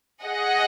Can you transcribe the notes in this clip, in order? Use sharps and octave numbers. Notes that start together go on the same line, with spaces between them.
G#4 D#5 F#5